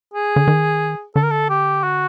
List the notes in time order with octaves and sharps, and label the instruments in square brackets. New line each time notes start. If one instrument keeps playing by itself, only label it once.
[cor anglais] G#4
[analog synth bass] D3
D#3
[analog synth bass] D3 [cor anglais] A4
[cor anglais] A#4
A4
G4
F#4